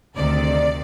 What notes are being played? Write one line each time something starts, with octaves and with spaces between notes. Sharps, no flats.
D2 C3 D#3 D5